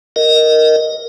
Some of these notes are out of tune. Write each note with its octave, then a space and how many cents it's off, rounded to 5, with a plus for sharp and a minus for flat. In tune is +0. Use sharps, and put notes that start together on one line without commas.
A#4 +0 D#5 +0